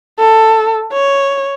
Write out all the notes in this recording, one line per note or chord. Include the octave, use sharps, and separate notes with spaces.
A4
C#5